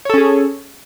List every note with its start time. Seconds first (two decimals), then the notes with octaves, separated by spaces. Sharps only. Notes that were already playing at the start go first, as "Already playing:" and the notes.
0.05 C#5
0.10 A4
0.14 C#4
0.18 G#4